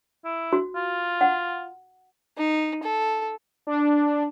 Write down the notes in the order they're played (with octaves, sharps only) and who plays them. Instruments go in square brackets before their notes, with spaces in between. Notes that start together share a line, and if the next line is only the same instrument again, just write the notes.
[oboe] E4
[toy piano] F#4
[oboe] F4
[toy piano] F#5
[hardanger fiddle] D#4
A4
[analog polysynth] D4